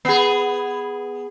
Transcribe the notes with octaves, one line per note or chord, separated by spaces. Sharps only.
B3 G#4